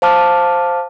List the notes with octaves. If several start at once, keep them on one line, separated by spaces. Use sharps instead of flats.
C5 F5 A5 D6 F6